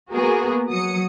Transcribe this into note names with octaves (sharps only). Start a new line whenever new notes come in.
A#3 B3 F#4 G#4 A#4
F#3 D#6 C#7